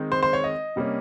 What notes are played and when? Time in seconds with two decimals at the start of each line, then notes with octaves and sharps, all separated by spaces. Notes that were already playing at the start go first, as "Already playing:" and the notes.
Already playing: D#3 G#3 C4 D#4
0.12 C5
0.23 C5
0.33 C#5
0.44 D#5
0.76 C3 G3 A#3 C#4